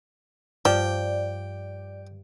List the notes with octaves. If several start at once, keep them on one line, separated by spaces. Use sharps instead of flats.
G2 F3 D5 G5